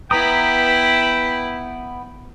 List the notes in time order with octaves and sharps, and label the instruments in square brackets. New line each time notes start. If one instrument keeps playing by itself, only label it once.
[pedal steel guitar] B3 A#5 D#6 [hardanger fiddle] E4 B4 [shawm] G5